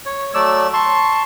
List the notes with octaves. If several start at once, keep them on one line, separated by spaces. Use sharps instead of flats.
C#5
F#3 A3 D5 E6
A5 C6 C#6